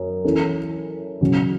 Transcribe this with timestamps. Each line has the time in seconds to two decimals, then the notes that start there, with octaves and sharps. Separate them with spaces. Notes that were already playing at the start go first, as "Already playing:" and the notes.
Already playing: F#2
0.25 E3 C#4 A4
1.21 C#3 F#3 C#4 F#4